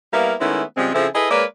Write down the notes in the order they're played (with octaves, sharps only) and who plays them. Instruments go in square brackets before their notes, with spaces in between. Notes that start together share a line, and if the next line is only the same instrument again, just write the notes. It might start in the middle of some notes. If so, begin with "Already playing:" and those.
[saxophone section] G3 A#3 B3 E4 A#4 F5
D#3 G#3 A3 B3 C#4 E4
C#3 F3 G3 G#3 C4
C#3 F3 C4 E4 G#4 A4
E4 G#4 A4 B4 D#5
G#3 A#3 A#4 B4 C#5 D5